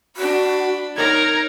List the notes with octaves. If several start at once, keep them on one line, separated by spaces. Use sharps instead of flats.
D4 F#4 B5
D#4 A#4 C#5 G#6